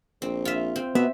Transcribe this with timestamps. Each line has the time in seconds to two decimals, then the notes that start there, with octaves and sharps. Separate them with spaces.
0.22 A#1 C4
0.45 F4 E5
0.76 C4
0.95 B2 B3 E5